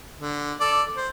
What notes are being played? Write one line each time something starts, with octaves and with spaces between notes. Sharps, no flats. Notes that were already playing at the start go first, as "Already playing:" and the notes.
D3
A4 D5
C5